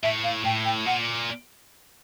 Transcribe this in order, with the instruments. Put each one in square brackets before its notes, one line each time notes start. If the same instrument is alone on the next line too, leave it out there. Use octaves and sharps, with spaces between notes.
[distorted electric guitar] A2 [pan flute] E5
[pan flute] F5
[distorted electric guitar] A2 [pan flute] G5
[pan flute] G5
[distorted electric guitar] A#2 [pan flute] F#5